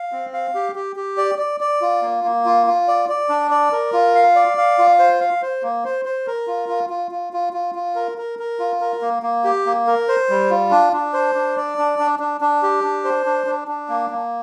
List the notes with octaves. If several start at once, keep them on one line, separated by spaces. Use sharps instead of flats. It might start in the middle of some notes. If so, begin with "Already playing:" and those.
Already playing: F5
C4
F5
G4
G4
G4
D5
D5
D5
F4
A#3
A#3
F4
F4
D5
D5
D4
D5
A#4
F4
F5
D5
F5
F4
C5
F5
C5
A#3
C5
C5
A#4
F4
F4
F4
F4
F4
F4
F4
A#4
A#4
A#4
F4
A#4
A#3
A#3
G4
A#3
A#4
C5
G3
F4
D4
D4
C5
D4
D5
D4
D4
D4
D4
G4
D4
C5
D4
D4
D4
A#3
A#3